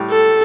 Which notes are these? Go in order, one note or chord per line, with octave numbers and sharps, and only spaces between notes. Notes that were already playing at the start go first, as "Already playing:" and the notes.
Already playing: A2 G3
A4